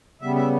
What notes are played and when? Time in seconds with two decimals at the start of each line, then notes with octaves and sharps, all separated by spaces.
0.21 C#3 G3 B3 E5
0.36 E5